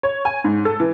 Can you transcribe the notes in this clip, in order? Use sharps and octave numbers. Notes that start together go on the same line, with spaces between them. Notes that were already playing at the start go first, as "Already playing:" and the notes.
C#5
G#5
G#2
A4
E3